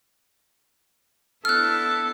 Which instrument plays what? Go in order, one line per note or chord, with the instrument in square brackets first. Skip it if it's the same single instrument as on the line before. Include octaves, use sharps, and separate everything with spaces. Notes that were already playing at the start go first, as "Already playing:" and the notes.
[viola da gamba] B3 D4 E4 [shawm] A4 [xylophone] F6 F#6